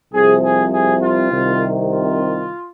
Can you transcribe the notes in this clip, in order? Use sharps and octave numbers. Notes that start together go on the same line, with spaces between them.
C2 C3 F3 G#4
G#4
G#4
F4
C2 C3 D#3
F4